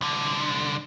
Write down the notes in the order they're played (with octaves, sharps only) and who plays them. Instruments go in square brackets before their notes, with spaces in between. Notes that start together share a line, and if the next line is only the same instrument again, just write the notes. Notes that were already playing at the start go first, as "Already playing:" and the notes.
[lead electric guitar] C2 D3